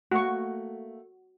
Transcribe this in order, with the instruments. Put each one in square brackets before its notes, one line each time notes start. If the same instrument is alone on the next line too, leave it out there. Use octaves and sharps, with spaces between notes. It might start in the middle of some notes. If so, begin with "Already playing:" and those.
[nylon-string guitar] A3 A#3 [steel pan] F#4 C#6